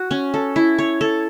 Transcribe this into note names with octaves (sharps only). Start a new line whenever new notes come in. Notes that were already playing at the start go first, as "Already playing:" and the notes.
Already playing: F#4
C#4
A4
E4
C#5
A4